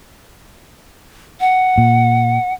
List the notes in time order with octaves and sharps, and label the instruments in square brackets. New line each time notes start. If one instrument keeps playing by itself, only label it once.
[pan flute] F#5
[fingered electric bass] A#2